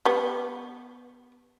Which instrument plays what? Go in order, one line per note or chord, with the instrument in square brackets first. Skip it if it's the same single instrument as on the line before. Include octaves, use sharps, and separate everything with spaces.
[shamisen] G3 B3